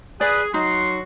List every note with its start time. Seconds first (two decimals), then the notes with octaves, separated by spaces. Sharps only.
0.21 G#4 B4 D5
0.54 F#3 D#4 F#4 C6